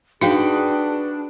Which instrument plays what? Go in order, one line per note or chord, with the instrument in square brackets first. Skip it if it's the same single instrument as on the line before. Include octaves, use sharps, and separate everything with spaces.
[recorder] D4 [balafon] D#4 F5 [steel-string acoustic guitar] F#4 B4 G5 [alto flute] G#4